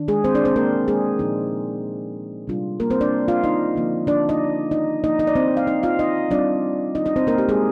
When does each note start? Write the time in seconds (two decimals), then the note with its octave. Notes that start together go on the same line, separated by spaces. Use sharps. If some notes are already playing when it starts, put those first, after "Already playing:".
Already playing: D#3 D4
0.08 G#3 G#4
0.24 C4 C5
0.35 D4 D5
0.45 C4 C5
0.56 A#3 A#4
0.88 G#3 G#4
1.19 A#2 F3 G#3 D#4
2.47 C3 G3 D4 F4
2.80 A#3 A#4
2.90 C4 C5
3.01 D4 D5
3.28 F4 F5
3.43 D#4 D#5
3.76 D3 F3 A#3 D4
4.07 D4 D5
4.29 D#4 D#5
4.71 D#4 D#5
5.04 F3 A#3 D#4 D#5
5.19 D#4 D#5
5.27 D5
5.35 C4 C5
5.57 F5
5.67 D#4 D#5
5.83 F4 F5
5.99 D#4 D#5
6.31 G3 C4 D4 F4 D5
6.95 D#4 D#5
7.06 D#4 D#5
7.16 C4 C5
7.27 A#3 A#4
7.38 G4
7.49 G#3 G#4